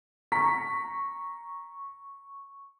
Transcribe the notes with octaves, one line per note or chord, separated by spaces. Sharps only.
A#5 C#6 B6